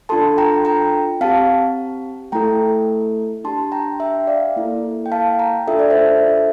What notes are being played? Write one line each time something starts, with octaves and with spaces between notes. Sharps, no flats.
D4 F4 A4 A5 C6
G5 A#5
G5 A#5
C4 G4 F5 A5
A3 E4 A4 G5 A#5
D4 G4 A5 C6
G5 A#5
E5 G5
D5 F5
A#3 E4 A4
G5
F5 A5
G5 A#5
D4 F4 A4 E5
D5
C5 E5